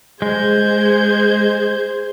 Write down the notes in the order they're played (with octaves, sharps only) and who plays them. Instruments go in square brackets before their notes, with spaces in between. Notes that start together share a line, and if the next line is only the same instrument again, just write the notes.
[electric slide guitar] G#3 [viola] G#4 C5 [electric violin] G6 G#6